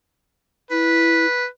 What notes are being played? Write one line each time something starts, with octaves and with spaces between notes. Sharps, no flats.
E4 B4